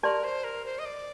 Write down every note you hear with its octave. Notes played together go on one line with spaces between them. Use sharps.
G4 A#4 D5 A5 C6
C5
A#4
C5
D#5
D5